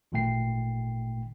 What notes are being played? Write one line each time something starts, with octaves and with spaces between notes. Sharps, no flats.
G#1 A#2 D#3 A3 G5 C7